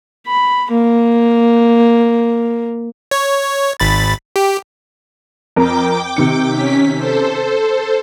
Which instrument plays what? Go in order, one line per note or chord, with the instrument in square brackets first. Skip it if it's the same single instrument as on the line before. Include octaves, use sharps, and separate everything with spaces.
[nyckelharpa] B5
A#3
[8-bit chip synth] C#5
G#1 B5 A6
G4
[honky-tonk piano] F2 A#4 [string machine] G5 D6
[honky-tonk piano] C3 D#3 C#7
[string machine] C#4 B6
A4 C5